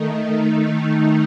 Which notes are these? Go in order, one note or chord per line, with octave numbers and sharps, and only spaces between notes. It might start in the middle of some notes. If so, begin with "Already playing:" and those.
Already playing: D#3 A3 D#4